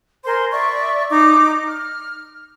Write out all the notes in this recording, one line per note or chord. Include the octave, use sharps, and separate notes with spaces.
A#4 C5 G#5 C6
D5 E5 C#6
D#4 D6
F6